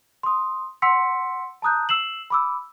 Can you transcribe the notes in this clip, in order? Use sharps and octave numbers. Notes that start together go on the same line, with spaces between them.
C6 D#6
F#5 C6 E6 B6 C#7
A5 A#5 D#6 F#6 G6
E6 C7 E7 F#7
B5 D6 E6